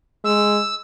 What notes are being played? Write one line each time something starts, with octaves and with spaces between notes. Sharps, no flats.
G#3 E6